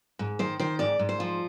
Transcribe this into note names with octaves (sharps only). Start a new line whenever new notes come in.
G#2
D#3 C5
D#3 C5
G#2 D5
G#2
C5
F3